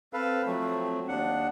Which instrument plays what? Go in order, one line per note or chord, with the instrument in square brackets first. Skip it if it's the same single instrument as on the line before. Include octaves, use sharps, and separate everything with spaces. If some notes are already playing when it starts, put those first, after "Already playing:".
[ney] C4 [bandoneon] A4 B4 F5
[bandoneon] F3 F#3 A3
D#2 D4 F#5